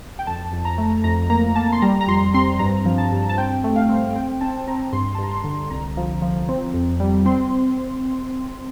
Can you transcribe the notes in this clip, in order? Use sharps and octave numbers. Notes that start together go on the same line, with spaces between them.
G5
F2 A5
F2
A#5
A3
F2 A#5
A#3 A#5
A#3 A5
C6
G3 A#5
A#5
F2 C6
C4 C6
G2 A#5
F3
A5
G2
A5
C4 G5
A3
F5
C4
C4 G5
C4 A5
C4 A#5
G2 C6
A5
G2 A#5
C6
D3
C2 A#5
F3
F3
C4
F2
G3
C4 C6